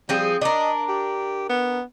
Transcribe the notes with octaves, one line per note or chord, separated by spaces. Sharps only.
F3 G3 C4 G#4
D4 A#4 D#5
G4
B3